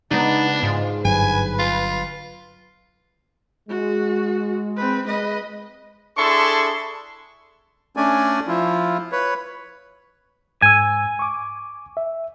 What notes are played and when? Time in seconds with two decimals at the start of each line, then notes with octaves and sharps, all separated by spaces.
0.11 C#3 G#3 B3 D4 D#4
0.63 G#2 F4
1.05 G1 G2 F#3 B4 G#5
1.59 F4
3.69 G#3 F#4
4.77 C4 B4
5.07 G#3 B4 D#5
6.16 D4 E4 G#4 A4 C6 C#6
7.97 A3 C#4 D4 D5 G#5
8.48 F3 E4 F4
9.12 B4 C#5
10.62 G#2 G#5 E6
11.19 C#6 D6
11.97 E5